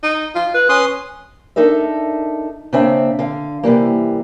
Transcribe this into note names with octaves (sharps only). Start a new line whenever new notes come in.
D#4
F4
B4 F#6
C#4 B4 C6 D#6
D4 D#4 A4 A#4 E5
C#3 A#3 C4 D4 E5
D3 F5
C3 E3 G3 A#3